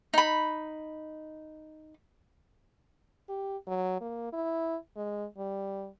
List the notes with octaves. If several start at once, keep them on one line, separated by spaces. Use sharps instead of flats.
D#4 B5
G4
F#3
A#3
E4
G#3
G3